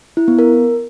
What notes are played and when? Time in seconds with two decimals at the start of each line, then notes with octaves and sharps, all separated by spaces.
0.17 E4
0.28 B3
0.39 A#4